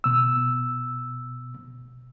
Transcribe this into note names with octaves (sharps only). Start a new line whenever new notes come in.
B2 E6